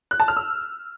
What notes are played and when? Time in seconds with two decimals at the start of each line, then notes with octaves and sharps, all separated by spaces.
0.11 F#6
0.20 A5
0.28 F6
0.37 E6